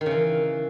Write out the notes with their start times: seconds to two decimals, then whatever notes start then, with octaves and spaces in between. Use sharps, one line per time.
0.01 D#3
0.06 C#3
0.11 E3